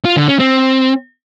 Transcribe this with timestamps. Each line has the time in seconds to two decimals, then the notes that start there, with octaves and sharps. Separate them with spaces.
0.05 F4
0.17 D3
0.28 C#4
0.39 C4